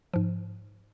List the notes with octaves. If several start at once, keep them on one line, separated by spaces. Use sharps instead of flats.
G#2 F3